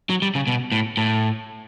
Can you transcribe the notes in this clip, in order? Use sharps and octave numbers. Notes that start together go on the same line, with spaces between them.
F#3
G3
C#3
B2
A2
A2